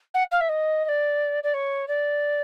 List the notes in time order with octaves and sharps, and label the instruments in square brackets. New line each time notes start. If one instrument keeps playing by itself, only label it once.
[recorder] F#5
F5
E5
D#5
D#5
D5
D5
C#5
D5